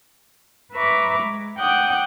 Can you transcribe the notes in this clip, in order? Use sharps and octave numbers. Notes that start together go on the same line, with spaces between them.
B4 E5 A#5 B5 C#6 D6
G#3
F#5 G5 D6 D#6 F#6 G6